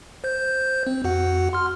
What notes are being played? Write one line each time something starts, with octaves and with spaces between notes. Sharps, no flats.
C5 G6
C4
F2 F#4 F#5
C6 F6